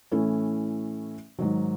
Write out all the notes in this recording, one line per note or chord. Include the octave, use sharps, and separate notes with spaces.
A2 E3 A3 C#4 E4
G#2 D#3 F#3